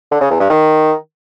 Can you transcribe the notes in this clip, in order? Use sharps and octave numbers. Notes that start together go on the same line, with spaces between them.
D3
C#3
E2
G2
D#3